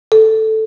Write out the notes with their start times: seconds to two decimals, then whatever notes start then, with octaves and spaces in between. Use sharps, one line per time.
0.12 A4